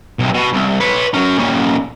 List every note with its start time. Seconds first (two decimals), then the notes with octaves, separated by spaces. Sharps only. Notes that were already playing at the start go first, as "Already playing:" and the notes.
0.19 B1 C3
0.34 B2
0.53 C2
0.80 B4 C#5
1.14 F#3 C#4
1.38 A#2 C#4